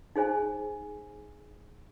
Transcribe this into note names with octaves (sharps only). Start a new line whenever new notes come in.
D#4 G#4 C5 G#5